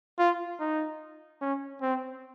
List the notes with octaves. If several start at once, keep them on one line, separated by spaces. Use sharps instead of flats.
F4
D#4
C#4
C4